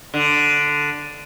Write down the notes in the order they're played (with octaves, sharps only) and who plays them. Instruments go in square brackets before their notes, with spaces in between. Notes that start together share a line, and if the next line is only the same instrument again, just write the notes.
[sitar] D3